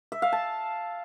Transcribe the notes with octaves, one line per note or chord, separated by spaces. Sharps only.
E5
F5
A5